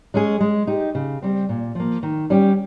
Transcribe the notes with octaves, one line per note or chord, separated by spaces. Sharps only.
G#3 C#4 G#4
G#3
D#4 G4
C#3
G3 C4
A#2
F3 A#3
D#3
G3 C#4 G4